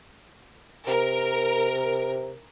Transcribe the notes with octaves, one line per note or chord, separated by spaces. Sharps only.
C3 A#4